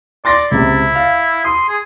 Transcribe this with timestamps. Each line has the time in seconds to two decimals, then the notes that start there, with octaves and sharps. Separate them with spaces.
0.25 D5 C6 A6 A#6
0.51 C#2 C3 E4
0.95 F5
1.44 C6 D#6
1.68 G#4